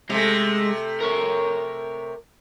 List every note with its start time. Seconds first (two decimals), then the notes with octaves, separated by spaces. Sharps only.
0.10 C3 G#3 A3
1.00 A#4 C#5